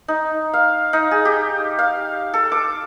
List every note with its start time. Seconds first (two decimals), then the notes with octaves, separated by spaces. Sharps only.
0.08 D#4
0.53 F5
0.93 D#4
1.11 G#4
1.25 G4
1.79 F5
2.34 A4
2.52 D6